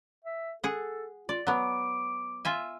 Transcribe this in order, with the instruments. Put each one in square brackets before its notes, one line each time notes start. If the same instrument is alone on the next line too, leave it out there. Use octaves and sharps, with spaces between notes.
[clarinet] E5
[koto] G#4 F#5 [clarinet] A4
[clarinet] F4 [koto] D5
[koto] F#3 B3 [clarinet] D6
[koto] F4 E5 G#5